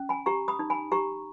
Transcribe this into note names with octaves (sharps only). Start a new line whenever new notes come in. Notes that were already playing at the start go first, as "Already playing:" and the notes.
Already playing: C#4
G#5 B5
G4 A#5 C#6
B5 D#6
D#4
G#5 B5
G4 A#5 C#6